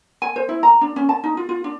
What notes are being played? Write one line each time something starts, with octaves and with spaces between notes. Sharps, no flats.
G#5
C5
E4
A#5
D4
C#4
A5
D#4
F4
F4
D4